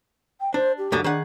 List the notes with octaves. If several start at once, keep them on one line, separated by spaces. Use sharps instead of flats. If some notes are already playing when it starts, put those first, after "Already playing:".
G5
D4 C5
G4
C#2 F#2 D3
D#3 D4 G#4 F#5